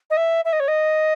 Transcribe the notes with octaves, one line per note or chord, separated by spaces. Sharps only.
D#5
E5
E5
D#5
C#5
D#5